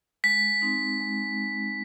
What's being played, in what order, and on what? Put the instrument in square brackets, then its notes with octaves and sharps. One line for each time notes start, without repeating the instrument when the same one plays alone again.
[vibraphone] G#3 [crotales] B6
[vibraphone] C4 D#4
G#3